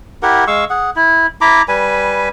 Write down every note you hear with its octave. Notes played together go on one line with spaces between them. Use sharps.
E4 G4 A#4 F#5
G#3 F5 C#6 E6
G#4 F#5
E4
E4 A#5 B5 D6
G3 B4 G#5 B5